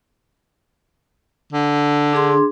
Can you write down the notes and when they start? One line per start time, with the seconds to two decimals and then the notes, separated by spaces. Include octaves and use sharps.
1.53 D3
2.13 D4 G#4 C6